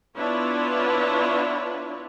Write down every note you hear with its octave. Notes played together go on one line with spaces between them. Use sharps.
B3 D4 E4 F4 B4 C#5